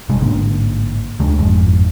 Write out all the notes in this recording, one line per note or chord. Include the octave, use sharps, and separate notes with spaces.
G1 B2 G3 G#3
A1 G#2 D3 A#3
D2 D3 G#3
G1 F2 G#2